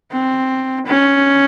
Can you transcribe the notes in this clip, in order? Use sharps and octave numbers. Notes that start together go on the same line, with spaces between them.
C4
C#4